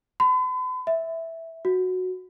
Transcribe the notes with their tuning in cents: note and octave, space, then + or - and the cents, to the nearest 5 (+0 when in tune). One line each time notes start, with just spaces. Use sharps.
B5 +45
E5 -5
F#4 -5